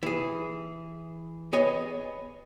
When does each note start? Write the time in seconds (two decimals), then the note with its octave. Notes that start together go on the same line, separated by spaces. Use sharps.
0.03 E3 G#4
1.53 B3 G#4 C#5 D#5 G#5